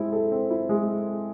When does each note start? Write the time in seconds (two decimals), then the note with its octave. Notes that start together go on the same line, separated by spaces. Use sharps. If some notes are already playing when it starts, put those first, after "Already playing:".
Already playing: G#3 C4 E4
0.12 A4
0.32 C4
0.50 E4
0.69 G#3